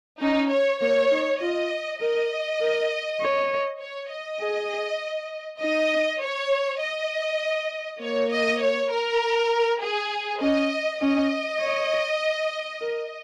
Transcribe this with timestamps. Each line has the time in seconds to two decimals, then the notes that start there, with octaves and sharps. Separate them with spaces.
0.21 C#4 D#4
0.50 C#5
0.80 A#3 C#5
1.11 D#4
1.41 F4 D#5
2.01 A#4 D#5
2.61 A#4
3.21 C#5
3.80 C#5
4.11 D#5
4.41 G#4
5.60 D#4 D#5
6.21 C#5
6.80 D#5
8.01 A#3 C#5
8.31 D#5
8.60 C#5
8.90 A#4
9.81 G#4
10.41 C#4 D#5
11.00 C#4 D#5
11.60 C#5
12.81 A#4